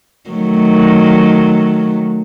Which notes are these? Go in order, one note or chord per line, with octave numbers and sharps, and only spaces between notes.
D#3 F#3 A3